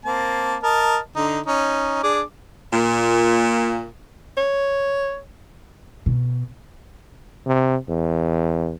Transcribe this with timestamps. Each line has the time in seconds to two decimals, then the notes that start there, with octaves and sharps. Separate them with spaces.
0.05 A#3 C4 A5
0.63 A#4 D#5 A5
1.16 D3 D#4
1.46 C#4 D#4
2.03 D4 G#4 D6
2.71 A#2
4.37 C#5
6.06 B2
7.46 C3
7.88 E2